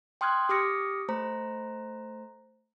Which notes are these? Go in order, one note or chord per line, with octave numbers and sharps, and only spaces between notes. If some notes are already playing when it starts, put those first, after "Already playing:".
G5 C6 D#6 F6 F#6 G#6
G4 D6 D#6 F6 A#6 C#7
A3 C5 A#5